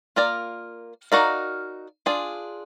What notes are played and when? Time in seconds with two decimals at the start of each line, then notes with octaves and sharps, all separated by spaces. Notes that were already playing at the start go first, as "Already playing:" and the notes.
0.16 A#3 F4 A#4 D5
1.12 D#4 F#4 A#4 D5 F5
2.06 D4 F4 G#4